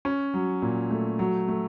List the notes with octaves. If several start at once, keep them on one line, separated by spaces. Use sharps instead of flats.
C#4
F#3
A#2
A3
F#3
A3